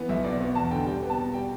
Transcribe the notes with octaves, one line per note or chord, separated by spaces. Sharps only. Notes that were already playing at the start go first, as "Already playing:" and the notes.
Already playing: E3 B3
B1 E5
B2 D5
B3
E2 A5
D3 G5
G3 G5
B3
A5
B2
G3 G5